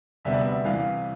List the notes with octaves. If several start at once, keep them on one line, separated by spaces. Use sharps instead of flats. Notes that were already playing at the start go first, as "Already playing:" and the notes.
D2 C3 G3 B3 D4 E5
D5
E5
C2 C3 E3 F5